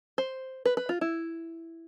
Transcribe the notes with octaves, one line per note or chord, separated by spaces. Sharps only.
C5
B4
B4
F4
E4